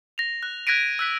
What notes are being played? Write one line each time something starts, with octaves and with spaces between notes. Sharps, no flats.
A#6 F7
F#6
F#6 G#6 A#6 B6 D7 D#7
E6 F#6 B6 F#7